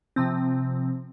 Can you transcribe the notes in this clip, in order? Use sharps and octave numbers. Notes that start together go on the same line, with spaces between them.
C3 F3 C4